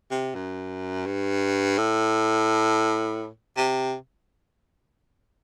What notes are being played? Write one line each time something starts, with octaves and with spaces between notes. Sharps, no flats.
C3
F#2
G2
A2
C3